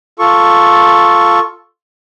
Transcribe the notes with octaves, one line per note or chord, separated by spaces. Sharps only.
F4 A4 C#6